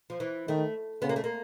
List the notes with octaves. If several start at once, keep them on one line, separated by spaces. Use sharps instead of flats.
F3
E3
D#3 A3
C#3 B3
A#3
A3
A#3